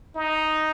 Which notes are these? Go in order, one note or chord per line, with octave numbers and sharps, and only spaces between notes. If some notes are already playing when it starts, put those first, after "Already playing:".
D#4